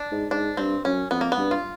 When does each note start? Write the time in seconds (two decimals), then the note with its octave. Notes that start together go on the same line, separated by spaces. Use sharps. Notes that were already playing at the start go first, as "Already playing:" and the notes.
Already playing: D4
0.11 G#2
0.31 G#2 D4
0.57 G2 C4
0.85 F#2 C#4
1.11 F2 B3
1.21 A#3
1.32 B3
1.38 G2
1.51 F4